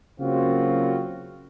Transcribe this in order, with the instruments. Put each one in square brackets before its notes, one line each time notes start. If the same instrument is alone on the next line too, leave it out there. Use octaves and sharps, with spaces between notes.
[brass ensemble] C#3 F#3 A#3 C4 F4 F#4